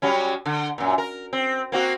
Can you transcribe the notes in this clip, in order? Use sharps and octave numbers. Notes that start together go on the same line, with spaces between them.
F#3 G3 C#4
D3
F#2 A#2
A#4
C4
A#3 C4 F#4